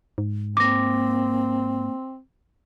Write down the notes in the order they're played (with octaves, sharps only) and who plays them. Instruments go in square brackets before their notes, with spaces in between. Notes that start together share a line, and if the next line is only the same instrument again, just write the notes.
[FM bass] G#2
[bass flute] A#3 [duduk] C4 [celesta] D6 A#6